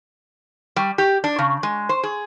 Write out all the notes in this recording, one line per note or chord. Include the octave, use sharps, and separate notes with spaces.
G3
G4
D4
C#3
G#3
C5
G#4